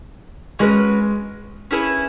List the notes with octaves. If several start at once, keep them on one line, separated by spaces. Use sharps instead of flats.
G#3 C#4 F#4 B4
C#4 E4 G#4 B4